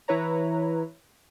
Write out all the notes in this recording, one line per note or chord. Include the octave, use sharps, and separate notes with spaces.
E3 E4 B4 C#5 A#5